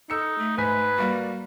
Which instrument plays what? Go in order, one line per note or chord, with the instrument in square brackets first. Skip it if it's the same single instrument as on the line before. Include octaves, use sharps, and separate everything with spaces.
[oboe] D#4 [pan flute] A4 [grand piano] E6 C#7
[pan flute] A3
[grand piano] G#2 G#5 B6 [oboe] B4
[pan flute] G3 [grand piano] A#3 F#4